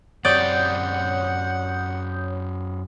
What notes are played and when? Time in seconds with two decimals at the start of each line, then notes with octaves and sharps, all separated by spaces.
0.25 F#2 C4 G4 C#5 D5 F#5 D#6 G6